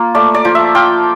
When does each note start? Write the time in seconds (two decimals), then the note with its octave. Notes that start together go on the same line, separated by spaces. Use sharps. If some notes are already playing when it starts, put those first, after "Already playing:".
Already playing: A#3 F4
0.15 A3 D5
0.35 D5
0.45 F3
0.55 E5
0.75 F4 G5